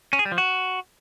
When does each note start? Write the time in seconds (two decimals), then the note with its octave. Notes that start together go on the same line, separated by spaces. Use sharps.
0.13 C#4
0.19 G#4
0.25 G3
0.32 F3
0.38 F#4